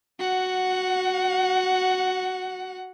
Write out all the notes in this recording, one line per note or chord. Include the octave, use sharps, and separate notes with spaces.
F#4 F#5